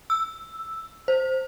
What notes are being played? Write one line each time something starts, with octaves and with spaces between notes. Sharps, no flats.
E6
C5